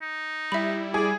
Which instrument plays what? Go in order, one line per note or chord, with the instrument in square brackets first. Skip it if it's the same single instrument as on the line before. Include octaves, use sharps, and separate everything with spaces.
[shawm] D#4
[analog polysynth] G3 E4 [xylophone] E5 B5
[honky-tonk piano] G#4 [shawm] D5